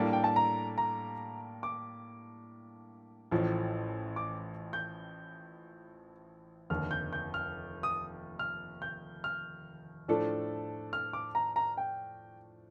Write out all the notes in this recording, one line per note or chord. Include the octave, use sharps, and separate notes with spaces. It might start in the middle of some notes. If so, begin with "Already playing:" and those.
Already playing: A2 G3 A#3 D4 A4
G5
A5
A#5
A#5
D6
A1 A2 F3
D6
G6
F1 D#2 D3 F6
G6
G6
F6
D#6
F6
G6
F6
A2 F3 A3 D4 A4
F6
D6
A#5
A#5
G5